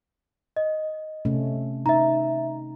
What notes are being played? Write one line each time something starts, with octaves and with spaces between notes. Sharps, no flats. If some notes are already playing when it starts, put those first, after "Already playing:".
D#5
C3 A3 C#4
D#4 E5 A#5